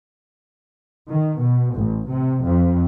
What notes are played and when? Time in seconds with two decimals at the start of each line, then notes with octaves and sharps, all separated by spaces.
1.08 D#3
1.39 B2
1.76 A1
2.09 C3
2.44 F2